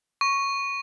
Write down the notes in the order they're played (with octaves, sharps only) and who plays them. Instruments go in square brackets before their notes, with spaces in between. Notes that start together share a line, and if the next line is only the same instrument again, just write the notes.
[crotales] C#6